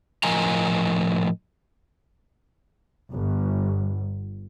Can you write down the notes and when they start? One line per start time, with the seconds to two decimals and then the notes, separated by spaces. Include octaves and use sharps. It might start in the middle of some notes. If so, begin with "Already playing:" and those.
0.23 A2 F3 A#4 D#5 G#5 A#5
3.12 G1